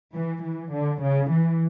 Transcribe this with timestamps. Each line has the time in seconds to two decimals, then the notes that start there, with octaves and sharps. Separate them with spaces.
0.14 E3
0.44 E3
0.72 D3
1.02 C#3
1.32 E3